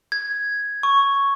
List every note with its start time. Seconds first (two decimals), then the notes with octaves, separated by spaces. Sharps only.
0.12 G#6
0.83 C#6